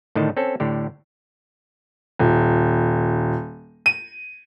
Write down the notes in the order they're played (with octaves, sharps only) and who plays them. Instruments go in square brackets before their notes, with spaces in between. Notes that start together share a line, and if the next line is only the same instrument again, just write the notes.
[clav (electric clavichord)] A2 D3 D#3 D#5 A5
C4 C#4 A4
A2 D3 G4
[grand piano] D#1
D#7